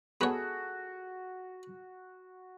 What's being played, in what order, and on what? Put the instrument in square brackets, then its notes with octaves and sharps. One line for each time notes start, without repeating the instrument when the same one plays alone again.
[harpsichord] B3 C#5 [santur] F#4 [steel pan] G#4 A4